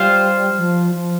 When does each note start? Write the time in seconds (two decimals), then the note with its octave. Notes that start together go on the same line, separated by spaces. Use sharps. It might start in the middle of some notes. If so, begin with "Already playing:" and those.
Already playing: G3 F4 C5 F5
0.58 F3
0.94 F3